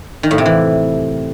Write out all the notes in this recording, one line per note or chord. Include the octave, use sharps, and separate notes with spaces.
D#3
A2
C3
E3